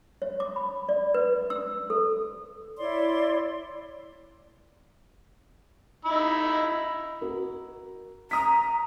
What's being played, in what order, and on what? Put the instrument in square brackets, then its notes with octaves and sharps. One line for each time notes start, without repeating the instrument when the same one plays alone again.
[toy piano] C#5
D6
B5
D5
B4
E6
A4
[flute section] E4 C#5 D5 C6
[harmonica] D#4 B5 E6
[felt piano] F#4 A#4
[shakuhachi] A#5 [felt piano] D#6 B6